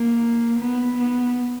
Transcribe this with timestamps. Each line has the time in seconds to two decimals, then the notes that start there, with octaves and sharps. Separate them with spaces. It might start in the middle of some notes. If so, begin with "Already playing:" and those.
Already playing: A#3
0.59 B3
0.98 B3